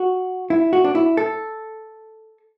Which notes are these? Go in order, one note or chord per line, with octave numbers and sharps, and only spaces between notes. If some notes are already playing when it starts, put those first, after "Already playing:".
Already playing: F#4
E4
F#4
D4
E4
A4